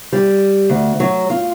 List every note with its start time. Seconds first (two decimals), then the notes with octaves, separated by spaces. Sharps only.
0.13 G3
0.70 D2
1.00 F#3
1.30 F4